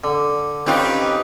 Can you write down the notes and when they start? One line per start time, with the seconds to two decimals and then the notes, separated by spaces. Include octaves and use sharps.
0.04 D3
0.66 C4 C#4 D#4 F4 G4 B4